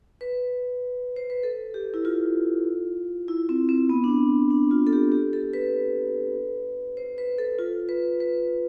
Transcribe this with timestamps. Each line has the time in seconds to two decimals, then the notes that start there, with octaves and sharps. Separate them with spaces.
0.21 B4
1.16 C5
1.30 B4
1.43 A4
1.74 G4
1.94 E4
2.05 F4
3.28 E4
3.49 C4
3.69 C4
3.89 B3
4.04 D4
4.09 C4
4.50 D4
4.71 F4
4.87 A4
4.93 G4
5.12 G4
5.33 A4
5.53 B4
6.97 C5
7.18 B4
7.38 A4
7.59 F4
7.89 B4
8.20 B4